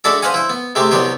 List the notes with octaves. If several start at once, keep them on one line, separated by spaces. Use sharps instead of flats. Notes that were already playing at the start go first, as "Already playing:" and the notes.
G#3 D4 F#4 A4 D5 E5
B4 C5 D#5 F5 F#5 G#5
E4 C5
B3
C3 G#3 A3 G4 C5
C2 F#3 B3 G4 C5